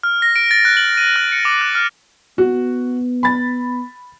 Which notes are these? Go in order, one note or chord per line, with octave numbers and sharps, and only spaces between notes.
F6
A#6
D7
A6
F#6
F#7
D#7
F#6
C#7
D6
F#6
F6
B3 F#4
B5 A6